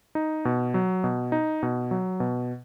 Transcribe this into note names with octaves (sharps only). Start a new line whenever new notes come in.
D#4
B2
F#3
B2
D#4
B2
F#3
B2